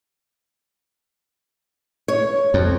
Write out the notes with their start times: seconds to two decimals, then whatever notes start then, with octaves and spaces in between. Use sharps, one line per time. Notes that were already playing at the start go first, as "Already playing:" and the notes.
2.08 C#5
2.54 F2